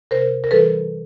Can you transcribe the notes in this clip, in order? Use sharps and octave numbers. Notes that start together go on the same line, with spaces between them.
C3 A#4 C5
A#4
E3 G3 A4 B4